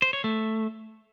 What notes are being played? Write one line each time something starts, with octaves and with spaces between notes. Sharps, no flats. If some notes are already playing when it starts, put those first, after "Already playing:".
C5
C#5
A3